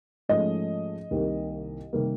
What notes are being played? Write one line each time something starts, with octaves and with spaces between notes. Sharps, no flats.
G#2 F3 A3 C#4 D#5
C2 C3 D#3 G3 A#3
C3 D#3 G3 A#3